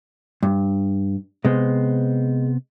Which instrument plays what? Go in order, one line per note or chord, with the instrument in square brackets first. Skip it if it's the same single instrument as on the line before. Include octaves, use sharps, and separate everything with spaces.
[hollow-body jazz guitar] G2
[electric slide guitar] C3 B3 C5 [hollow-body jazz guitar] G#3